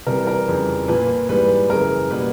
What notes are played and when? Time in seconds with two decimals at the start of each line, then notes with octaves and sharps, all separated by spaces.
0.07 C3 E3 G3 B3 A#4
0.27 A#4
0.48 F2 C#3 E3 G3
0.88 A#2 F3 A#3 B4
1.29 G#2 E3 G3 B4
1.70 F#2 C#3 E3 A#4
2.10 B2 G3 A#3 B4